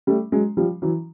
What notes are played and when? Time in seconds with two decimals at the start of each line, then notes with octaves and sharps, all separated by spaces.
0.07 G3 A3
0.32 F#3 G#3
0.57 F3 G3
0.82 E3 F#3